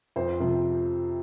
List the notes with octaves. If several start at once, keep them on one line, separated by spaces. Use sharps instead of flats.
F2 C5
C3 F3